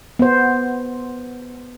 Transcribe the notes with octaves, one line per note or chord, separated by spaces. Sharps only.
B3 C5